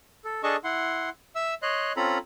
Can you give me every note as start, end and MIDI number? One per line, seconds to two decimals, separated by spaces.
0.24 0.42 69
0.43 0.56 62
0.43 0.56 68
0.43 0.56 69
0.43 0.56 75
0.43 0.56 81
0.43 0.56 85
0.64 1.10 64
0.64 1.10 78
0.64 1.10 84
1.35 1.54 76
1.35 1.54 88
1.62 1.93 73
1.62 1.93 75
1.62 1.93 84
1.62 1.93 90
1.96 2.18 60
1.96 2.18 61
1.96 2.18 65
1.96 2.18 69
1.96 2.18 82
1.96 2.18 83